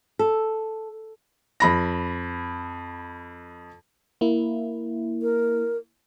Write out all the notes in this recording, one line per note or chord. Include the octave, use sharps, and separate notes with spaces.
A4
F2 B5 A#6
A#3 E4
A#4